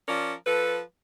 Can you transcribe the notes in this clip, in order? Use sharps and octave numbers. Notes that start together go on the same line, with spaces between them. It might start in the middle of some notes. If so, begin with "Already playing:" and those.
F3 C#4 A#4 D5
F3 A4 B4